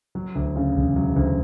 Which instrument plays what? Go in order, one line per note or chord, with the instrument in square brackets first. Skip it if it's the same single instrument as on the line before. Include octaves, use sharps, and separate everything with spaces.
[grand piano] F#3
D2
C#3
E1
F#3
D2